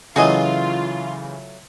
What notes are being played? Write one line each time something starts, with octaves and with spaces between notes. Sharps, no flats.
C#3 E3 F#3 A3 F4 F#4 G#4 D#5